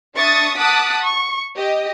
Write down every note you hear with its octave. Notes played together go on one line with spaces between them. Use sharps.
D4 E5 C#6 D#6 A6
F#5 A5 D6 D#6 F#6 B6
C#6
G4 D#5